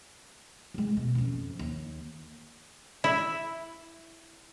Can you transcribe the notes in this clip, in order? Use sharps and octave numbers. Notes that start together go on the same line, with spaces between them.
F1 G#3
B2
F#1 F2
D#2
E4